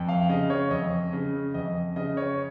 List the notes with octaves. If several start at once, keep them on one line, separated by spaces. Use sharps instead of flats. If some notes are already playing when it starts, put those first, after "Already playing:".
Already playing: F2
F5
C#3 D#5
C#5
F2 D#5
C#3
F2 D#5
C#3 D#5
C#5